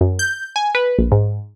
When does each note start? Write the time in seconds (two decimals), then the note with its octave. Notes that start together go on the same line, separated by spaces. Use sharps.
0.01 F#2
0.19 G6
0.56 G#5
0.75 B4
0.98 A#1
1.12 G#2